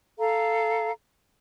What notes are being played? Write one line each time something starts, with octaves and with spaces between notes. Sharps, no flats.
A4 F5 A#5